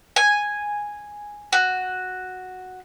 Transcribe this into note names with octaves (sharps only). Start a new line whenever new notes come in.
G#5
F#4